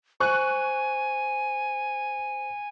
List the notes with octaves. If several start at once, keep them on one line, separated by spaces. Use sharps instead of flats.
C5 G#5 C#6 F#6